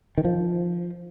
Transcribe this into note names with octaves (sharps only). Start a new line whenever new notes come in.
D#3
F3